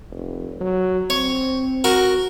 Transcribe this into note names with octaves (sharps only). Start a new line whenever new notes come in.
F1
F#3
C4 C#5
F#4 A#4